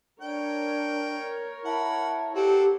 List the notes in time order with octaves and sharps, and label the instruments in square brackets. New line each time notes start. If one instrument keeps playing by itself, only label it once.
[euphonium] D4 [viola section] A#4 C#5 [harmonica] G5
[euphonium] E4 [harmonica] F#5 B5 [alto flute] A5
[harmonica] C4 A4 F#5 [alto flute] G4